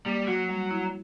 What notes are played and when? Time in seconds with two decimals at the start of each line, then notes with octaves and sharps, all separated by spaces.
0.05 G3 A#3
0.27 F#3 F#4
0.49 G3
0.71 E4